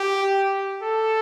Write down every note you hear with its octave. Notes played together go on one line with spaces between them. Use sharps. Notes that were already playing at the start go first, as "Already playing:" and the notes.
Already playing: G4
A4